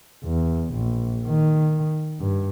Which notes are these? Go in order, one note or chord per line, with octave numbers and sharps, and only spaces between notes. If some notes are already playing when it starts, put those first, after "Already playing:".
E2
A#1
D#3
G2